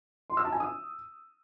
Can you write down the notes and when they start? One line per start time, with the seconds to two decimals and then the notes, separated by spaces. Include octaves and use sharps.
0.30 C6
0.37 E6
0.45 A5
0.52 G#5
0.60 D#6